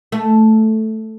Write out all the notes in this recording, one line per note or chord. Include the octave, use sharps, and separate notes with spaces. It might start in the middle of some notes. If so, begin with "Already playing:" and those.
A3